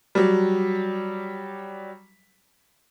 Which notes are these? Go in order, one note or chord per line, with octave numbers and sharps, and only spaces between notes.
F#3 G3